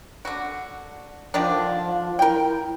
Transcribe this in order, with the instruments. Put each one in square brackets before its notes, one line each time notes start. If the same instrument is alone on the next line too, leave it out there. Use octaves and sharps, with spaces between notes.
[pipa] D3 F#4
[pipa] D3 D#3 D4 [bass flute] F3
[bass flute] E4 [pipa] A#4 G5